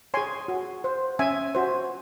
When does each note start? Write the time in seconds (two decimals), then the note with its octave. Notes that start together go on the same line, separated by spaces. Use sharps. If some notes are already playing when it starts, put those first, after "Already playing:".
0.14 G#4 C#5 G#5 C6
0.48 F#4
0.84 C5
1.19 C#4 E5 G#5
1.55 F#4 C5